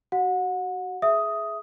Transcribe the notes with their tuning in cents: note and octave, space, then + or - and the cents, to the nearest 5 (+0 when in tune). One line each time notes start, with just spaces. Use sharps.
F#4 +25 F#5 -30
G#4 +20 E5 +0 D#6 +5